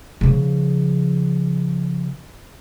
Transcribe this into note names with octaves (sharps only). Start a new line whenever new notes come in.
C#3 F3